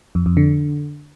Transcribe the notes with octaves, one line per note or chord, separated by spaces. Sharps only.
F2
F2
D3